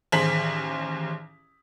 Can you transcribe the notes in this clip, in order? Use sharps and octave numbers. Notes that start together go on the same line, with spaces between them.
A1 D#2 G#4 C5 B6 F#7